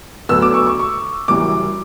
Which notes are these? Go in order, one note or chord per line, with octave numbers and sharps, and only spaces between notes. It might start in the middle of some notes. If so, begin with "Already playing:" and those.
D2 D3 F#3 B3 D4 E6
D6
C#6
C#6
C#6
F#1 F#2 E3 G3 D6